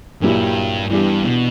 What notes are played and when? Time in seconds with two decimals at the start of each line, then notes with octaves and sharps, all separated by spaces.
0.22 G2 A#2 F#3 A#3 E4 G4
0.90 G2 E3 B3 D4 G4
1.24 B2